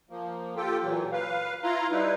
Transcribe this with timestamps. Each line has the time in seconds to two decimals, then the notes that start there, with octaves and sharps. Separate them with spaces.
0.10 F3 A#3
0.56 F4 G4 A4 G5
0.83 A#2 E3 F#3
1.12 B4 F5
1.63 E4 F4 F5 A#5 C6
1.91 G3 D#4 E4 B4